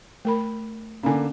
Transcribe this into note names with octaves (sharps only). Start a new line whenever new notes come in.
A3 A#4 B5
D3 A#3 C#4 G#5